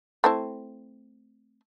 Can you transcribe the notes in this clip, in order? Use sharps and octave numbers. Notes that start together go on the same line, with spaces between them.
A3 C4 E4